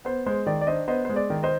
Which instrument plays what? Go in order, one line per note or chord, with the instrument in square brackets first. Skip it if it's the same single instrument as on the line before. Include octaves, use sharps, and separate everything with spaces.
[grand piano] B3 C5
G#3 C5
D#3 D5
D5
D4 C5 D#5
B3 C5 D#5
G#3 C5
D5
D#3
C5 D#5